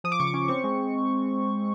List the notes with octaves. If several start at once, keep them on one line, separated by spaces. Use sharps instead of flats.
F3 D#6
D6
C#3 C#6
D6
C#4
C4 C#6
G#3